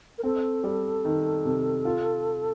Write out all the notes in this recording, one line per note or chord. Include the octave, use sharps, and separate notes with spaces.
A#4
C4 A4
G3
D#3
C3
F4